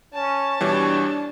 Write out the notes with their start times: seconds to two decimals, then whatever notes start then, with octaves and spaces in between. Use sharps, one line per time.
0.14 C#4 A5
0.61 B2 E3 G3 D4 C#5